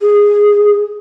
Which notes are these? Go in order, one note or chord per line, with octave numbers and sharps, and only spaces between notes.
G#4